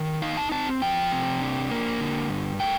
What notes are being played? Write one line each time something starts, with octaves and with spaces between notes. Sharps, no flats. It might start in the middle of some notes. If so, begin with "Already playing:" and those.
Already playing: D#3
D#4 F5
A5
C4 A5
F3 G5
C3
D4
A#3
D3
G2
A3 G5